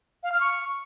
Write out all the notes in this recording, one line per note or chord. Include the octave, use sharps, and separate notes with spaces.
F5
F6
C#6